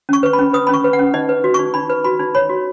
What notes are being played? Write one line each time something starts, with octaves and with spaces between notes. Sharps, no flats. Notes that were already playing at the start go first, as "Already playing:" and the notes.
C#4 C#6
B4 C#6
B5
C#4
B4 D#6
C#4 B5
C#6
B4
F#5
C#4
D#4 D#5
B4
F#4
D#4 C#6
D#4 B5
B4
F#4 B5
D#4
C#5 B5
F#4